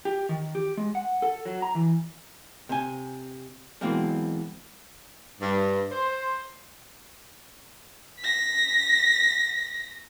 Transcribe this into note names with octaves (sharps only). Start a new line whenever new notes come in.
G4
D#3
G4
G#3
F#5
A4
F#3
A#5
E3
C3 G#5
B2 E3 F#3 G#3 A#3 C4
G2
C5
A#6 B6